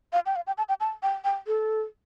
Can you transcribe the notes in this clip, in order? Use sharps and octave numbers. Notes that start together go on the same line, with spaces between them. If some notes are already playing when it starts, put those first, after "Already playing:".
F5
G5
F5
G5
A5
G5
A5
G5
G5
A4